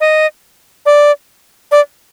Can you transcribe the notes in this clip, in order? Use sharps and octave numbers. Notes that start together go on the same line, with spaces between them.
D#5
D5
D5